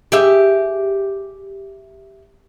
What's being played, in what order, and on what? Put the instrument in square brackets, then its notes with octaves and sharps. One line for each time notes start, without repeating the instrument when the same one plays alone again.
[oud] G4 G#4 E5